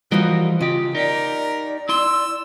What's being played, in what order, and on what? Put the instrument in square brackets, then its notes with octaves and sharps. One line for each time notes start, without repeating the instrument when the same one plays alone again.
[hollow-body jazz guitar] E3 F3 [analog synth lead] G3 [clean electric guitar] F#4 A#4 D#5
[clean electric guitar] C#3 G4 [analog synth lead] F4 [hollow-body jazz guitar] D#5
[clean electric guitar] D#4 G4 [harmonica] A#4 [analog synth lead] D5
[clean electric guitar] E4 C6 [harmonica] E6